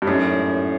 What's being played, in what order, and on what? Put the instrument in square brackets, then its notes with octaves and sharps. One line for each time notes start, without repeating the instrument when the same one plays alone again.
[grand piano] G2
[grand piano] F#2 [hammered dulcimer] A2 F#3 A#3 D#4